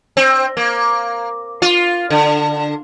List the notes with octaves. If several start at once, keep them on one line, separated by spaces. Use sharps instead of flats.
C4
A#3
F4
D3